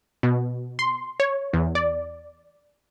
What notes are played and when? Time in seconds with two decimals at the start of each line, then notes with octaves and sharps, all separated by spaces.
0.23 B2
0.79 C6
1.20 C#5
1.53 E2
1.75 D5